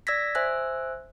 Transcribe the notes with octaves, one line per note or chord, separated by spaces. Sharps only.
D5 E6 G#6 A#6 B6
C5 E5 G#5 E6 F#6